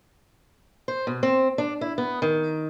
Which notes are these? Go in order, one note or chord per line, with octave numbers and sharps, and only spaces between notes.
C5
B2
C4
D4
E4
B3
D#3